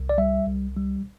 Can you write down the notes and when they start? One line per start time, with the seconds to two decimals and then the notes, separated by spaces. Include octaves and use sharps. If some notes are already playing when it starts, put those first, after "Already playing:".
Already playing: C2
0.09 D5
0.18 G3 E5
0.46 C2
0.76 G3